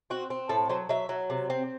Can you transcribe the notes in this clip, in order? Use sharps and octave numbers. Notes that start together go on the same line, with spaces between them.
C4 F#4
C4
A2 A4
F#3 C5
F#3 E5
F#3
C3
C4